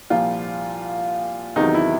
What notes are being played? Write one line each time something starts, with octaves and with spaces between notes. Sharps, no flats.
C2 A#2 F3 F4
E2 C3 D#3 F#3 D#4
E4